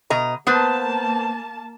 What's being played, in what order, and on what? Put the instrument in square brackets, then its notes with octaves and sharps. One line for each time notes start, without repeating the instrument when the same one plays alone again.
[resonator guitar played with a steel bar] B2 D#5 A#5
[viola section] A#3 A5 [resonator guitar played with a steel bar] B3 B4 C5